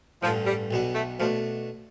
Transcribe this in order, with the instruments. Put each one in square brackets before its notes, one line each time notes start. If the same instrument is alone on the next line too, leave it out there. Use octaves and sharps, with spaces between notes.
[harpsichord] A1 G2 D3 [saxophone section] F3
[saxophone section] G3
[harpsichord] B1 B2 B3 D4
[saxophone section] A3
[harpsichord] B2 A3 D4 [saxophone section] F3